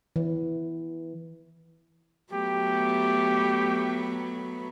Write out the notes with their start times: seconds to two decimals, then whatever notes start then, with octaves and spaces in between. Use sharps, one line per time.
0.16 E3
2.33 F#3 A3 B3 G4